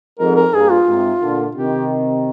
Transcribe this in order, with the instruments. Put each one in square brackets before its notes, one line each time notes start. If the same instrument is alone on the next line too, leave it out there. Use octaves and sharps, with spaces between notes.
[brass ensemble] F2 G#2 [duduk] A#4
[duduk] A#4
[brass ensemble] G2 A#2 [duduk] G#4
[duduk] F4
[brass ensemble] G#2 C3
A#2 D3
[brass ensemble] C3 D#3 [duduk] G4